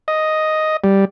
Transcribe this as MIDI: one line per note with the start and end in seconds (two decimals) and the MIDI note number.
0.08 0.77 75
0.84 1.05 55